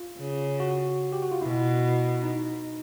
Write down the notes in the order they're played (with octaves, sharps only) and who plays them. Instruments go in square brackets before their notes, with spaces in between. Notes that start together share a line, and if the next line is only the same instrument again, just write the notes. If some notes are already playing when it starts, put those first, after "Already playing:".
Already playing: [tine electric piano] F4
[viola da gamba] C#3
[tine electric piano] F#4
G4
F#4
F4
[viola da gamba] B2 [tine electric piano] E4
[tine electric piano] D#4